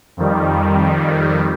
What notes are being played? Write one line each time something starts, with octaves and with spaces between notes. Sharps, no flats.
F2 D#3 G3